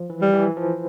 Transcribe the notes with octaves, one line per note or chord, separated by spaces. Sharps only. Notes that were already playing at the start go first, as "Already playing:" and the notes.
Already playing: F3
E3
G3
E3
F3